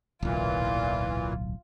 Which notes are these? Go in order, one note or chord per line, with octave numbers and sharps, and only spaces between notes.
D1 B1 A#2 E3 F4